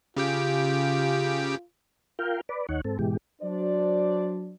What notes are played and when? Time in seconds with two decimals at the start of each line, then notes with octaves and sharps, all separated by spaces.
0.17 C#3 F4 G4 G5
2.19 F4 A#4 F5 G5
2.49 B4 D5
2.69 D#2 D#4 C#5 F#5
2.85 G#2 C4 A4
2.99 G#2 B2 E3 G#3 G4
3.42 F#3 D4 C5 D5